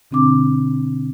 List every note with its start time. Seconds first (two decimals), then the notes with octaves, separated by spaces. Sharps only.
0.11 B2 D3 C4 D4 D6